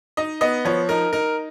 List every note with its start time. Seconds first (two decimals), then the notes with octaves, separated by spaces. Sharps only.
0.17 D#4 D#5
0.41 B3 D#5
0.65 F3 C#5
0.89 D#4 A#4
1.13 D#4 A#4